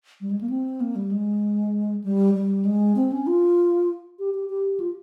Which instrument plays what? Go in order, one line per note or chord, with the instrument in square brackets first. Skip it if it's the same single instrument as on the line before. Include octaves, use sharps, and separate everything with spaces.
[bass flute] G3
G#3
A#3
C4
A#3
G3
G#3
G3
G3
G#3
C4
C#4
F4
G4
G4
G4
F4